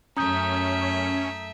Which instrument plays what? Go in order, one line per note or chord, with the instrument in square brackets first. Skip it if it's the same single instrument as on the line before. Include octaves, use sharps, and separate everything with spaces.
[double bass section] F#2 [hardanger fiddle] A3 E5 [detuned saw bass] C#4 [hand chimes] A#5 D#6 G6